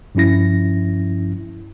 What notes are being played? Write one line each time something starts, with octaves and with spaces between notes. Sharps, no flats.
G2 F3 C#4 E4 A#6